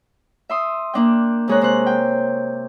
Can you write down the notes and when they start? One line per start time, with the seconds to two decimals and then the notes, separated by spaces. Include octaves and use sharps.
0.49 E5 C6 D#6
0.94 A#3 D4 G5
1.48 C3 G#3 G#4 C#5 A#5 F#6
1.61 C3 C5 C#5 F#6
1.86 G5